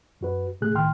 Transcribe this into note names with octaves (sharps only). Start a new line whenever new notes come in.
F#2 F#4 B4
A2 C#3 A3 G#4 F#6
C2 A2 D#3 G5 C6 F6